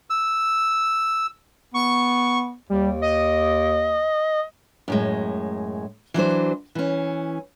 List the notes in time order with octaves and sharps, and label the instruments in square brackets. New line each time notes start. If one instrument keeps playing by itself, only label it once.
[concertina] E6
[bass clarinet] B3 [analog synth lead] C#6
[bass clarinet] D#2 [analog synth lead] G3
[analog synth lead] D#5
[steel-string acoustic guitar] F#2 A2 G#3
E3 F#3 D4 C5
E3 C#4